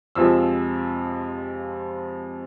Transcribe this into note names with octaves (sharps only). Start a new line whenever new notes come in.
F2 C3 F3 G#3 E6